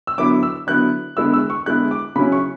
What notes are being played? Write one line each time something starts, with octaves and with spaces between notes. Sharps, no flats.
E6
D3 F#3 B3 E4 D6
E6
D3 F#3 B3 E4 F#6
D3 G#3 B3 E4 E6
E6
C#6
D3 G#3 B3 E4 F#6
D6
C#3 F#3 C#4 E4 B5
C#6